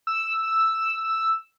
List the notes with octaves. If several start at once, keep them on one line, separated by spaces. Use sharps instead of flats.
E6